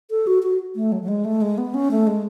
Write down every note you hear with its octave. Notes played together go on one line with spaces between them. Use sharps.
A4
F#4
F#4
A3
F#3
F#3
G#3
A3
G#3
B3
C#4
A3
G#3